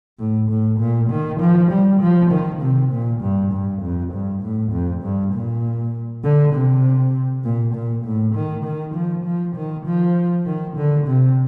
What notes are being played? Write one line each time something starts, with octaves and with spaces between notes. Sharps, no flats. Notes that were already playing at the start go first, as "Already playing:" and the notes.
A2
A2
A#2
D#3
F3
G3
F3
D#3
C3
A#2
G2
G2
F2
G2
A2
F2
G2
A#2
D3
C3
A#2
A#2
A2
D#3
D#3
F3
F3
D#3
F3
D#3
D3
C3